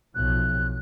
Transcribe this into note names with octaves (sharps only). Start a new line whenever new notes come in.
B1 F3 F#6